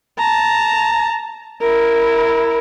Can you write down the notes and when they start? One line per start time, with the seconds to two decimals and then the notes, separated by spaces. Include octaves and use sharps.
0.18 A5 A#5
1.61 E4 A#4